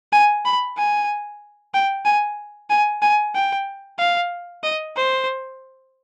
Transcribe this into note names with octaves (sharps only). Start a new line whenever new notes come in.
G#5
B5
G#5
G5
G#5
G#5
G#5
G5
F5
D#5
C5